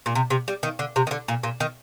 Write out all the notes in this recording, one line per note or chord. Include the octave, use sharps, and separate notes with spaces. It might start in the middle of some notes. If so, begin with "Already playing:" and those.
A#2
C3
C3
G3
D#3
D3
C3
D#3
D3
A#2
A#2
D#3